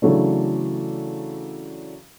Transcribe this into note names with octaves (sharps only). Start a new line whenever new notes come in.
C#3 E3 F#3 A3 D4